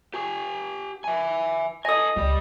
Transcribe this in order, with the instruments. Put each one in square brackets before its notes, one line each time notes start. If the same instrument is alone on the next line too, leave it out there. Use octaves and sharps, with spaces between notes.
[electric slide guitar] G4 G#5
E5 G#5
[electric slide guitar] A4 G#5 [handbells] D#5 D#6
[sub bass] C#2 [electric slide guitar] G3 G4